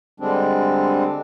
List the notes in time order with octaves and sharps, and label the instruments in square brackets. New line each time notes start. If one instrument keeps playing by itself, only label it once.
[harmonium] D3 G3 G#3 C4 D4